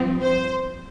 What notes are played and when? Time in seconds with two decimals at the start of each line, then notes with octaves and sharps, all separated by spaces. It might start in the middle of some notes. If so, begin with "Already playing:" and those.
Already playing: G2 F3 C4
0.22 C5